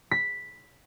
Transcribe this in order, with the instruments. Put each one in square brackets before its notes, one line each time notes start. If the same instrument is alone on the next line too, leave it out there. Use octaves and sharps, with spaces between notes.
[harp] B6